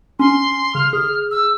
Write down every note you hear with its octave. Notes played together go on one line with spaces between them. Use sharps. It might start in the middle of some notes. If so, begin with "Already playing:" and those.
C#4 C6
C#3 F6
G#4
E6